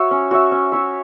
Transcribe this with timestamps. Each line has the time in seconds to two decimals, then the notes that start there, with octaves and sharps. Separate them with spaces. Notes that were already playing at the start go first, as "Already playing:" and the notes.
Already playing: F#4 C#5 E5
0.11 C#4
0.31 F#4 C#5 E5
0.52 C#4
0.72 F#4 C#5 E5